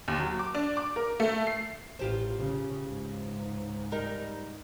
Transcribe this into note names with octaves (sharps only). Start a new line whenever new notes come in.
D#2
F#3
D6
D4
D6
A#4
A3
C7
A1 F4 G4 C5
C#3 C#4
C#2 G#2
G3 D#4 A#4